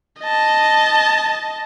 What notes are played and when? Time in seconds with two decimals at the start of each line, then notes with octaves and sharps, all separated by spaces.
0.20 D#5 A5